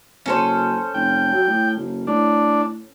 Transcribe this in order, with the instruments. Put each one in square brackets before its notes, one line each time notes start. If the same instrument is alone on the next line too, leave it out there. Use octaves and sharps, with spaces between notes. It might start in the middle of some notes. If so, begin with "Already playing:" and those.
[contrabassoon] F#1 [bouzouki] C#4 A4 C5
[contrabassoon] F1 [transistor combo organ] G5
[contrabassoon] F#3
A2
F#1
[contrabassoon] A2 [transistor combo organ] D4